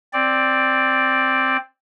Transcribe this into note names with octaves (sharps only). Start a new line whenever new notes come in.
C4 D5